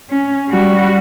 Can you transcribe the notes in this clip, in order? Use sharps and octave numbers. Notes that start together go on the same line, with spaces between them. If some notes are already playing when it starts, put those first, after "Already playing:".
C#4
G3 F#4